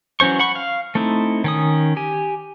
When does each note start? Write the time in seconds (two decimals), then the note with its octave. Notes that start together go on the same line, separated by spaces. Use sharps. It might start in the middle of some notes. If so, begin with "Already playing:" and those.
0.20 E3 F#3 C#4 C5 C#6
0.39 F#5 B5 C#6
0.55 F5
0.95 A3 C4 D#4 E4
1.44 D#3 C#4 D#6
1.96 G4 G#5